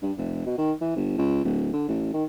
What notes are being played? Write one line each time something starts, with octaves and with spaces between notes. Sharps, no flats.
G2
F1
B2
D#3
E3
G1
C#2
D1
D3
A1
D#3